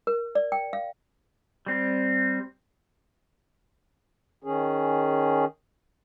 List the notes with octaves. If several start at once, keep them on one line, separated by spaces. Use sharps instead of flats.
A#4
D5
G5
F5
G3 C4
D#3 C#4 G#4